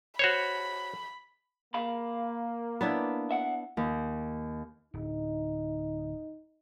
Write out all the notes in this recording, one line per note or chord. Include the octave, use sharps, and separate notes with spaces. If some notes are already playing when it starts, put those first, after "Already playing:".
F#4 C5 C#5 B5
A#3 F5 B5
B3 D4 E4
E5 F#5
D#2
D1 D#4